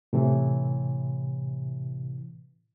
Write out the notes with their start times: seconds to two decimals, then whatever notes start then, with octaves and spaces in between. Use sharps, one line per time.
0.13 A2 C3 E3